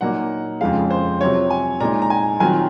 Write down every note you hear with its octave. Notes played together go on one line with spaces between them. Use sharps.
A#2 F#3 A#3 D#4 F#5
F2 C#3 F3 G#3 F5
C5
C3 F#3 C4 F4 C#5
G#5
A#2 G#3 D#4 A#5
A#5
G#5
D#3 F#3 C4 F4 G#5